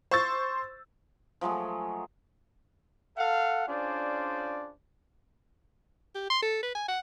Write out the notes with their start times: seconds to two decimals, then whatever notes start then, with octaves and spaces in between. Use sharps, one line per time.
0.11 C5 C6 C#6 E6 A6
1.41 F3 F#3 G#3 A3
3.17 A4 F5 F#5
3.67 C#4 D4 F4 G#4 C5 D5
6.15 G4
6.30 C6
6.43 A4
6.63 B4
6.75 G#5
6.88 F#5